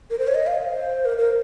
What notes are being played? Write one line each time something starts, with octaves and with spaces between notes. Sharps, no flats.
A#4
C5
C#5
D#5
F5
C5
A#4
A#4